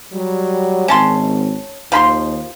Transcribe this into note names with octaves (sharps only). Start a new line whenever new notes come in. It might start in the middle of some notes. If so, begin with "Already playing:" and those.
F#3 G3
G#1 C#4 A5 C6
D#2 F3 B5 C6